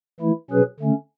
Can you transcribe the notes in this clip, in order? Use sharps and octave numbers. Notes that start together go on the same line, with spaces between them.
E3 A3 E4
B2 F#3 C#4 G#4 B4
D3 A3 C#4